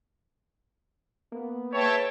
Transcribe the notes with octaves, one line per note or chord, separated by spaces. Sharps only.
A#3 B3
D#4 G#4 B4 C#5 E5 G5 A5